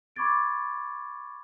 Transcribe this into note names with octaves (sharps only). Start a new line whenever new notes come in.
B5 C#6 D6 G#6 A6 D7